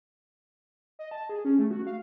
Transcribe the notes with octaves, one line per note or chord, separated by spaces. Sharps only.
D#5
A5
G#4
C#4
A3
F#4
F5